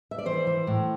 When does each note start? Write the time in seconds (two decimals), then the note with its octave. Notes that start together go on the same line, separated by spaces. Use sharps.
0.11 E5
0.19 D5
0.26 E3 C5
0.47 E3
0.67 A2